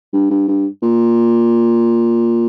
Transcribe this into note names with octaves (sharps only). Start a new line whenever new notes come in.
G2
G2
G2
A#2